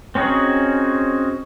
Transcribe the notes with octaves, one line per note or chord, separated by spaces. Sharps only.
C4 C#4 D#4 F#4 G#4